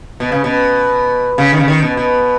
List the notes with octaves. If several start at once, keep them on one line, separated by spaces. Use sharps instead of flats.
B2
C#3
B2
C#3
D#3
C#3
D#3
B2
B2